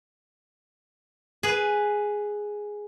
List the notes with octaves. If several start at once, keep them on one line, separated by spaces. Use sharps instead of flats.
G#4 B4